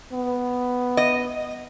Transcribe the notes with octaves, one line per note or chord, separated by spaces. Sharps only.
B3
D#5